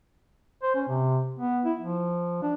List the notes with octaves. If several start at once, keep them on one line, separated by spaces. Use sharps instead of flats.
C5
C#4
C3
B3
E4
F3
D4